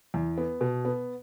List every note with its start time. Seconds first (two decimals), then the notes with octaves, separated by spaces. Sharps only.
0.14 E2
0.38 B3
0.61 B2
0.85 B3